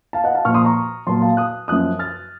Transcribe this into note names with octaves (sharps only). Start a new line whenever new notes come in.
F5 A5
D#5 F#5
F5 A5
A#2 F3 C#6 F6
C6 D#6
A#5 C#6
A#2 F#3 A5 C6
F5 A5
D#6 F#6
F#2 F3 D#6 F#6
F6 A6